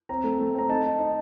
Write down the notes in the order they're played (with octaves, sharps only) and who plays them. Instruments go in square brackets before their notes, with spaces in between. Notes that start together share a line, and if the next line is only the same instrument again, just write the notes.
[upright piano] C4 A#5
A3
A3
C4 A#5
D#4 A5
D#4
D#4